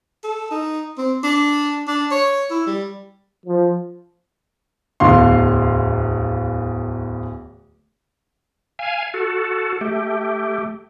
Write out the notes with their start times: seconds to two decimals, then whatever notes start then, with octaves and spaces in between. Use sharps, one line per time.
0.23 A4
0.51 D#4
0.98 C4
1.23 D4
1.87 D4
2.11 C#5
2.50 E4
2.67 G3
3.46 F3
5.00 D1 E2 D3 F5 C6
8.79 F5 G#5
9.14 F#4 A4
9.81 A3 G4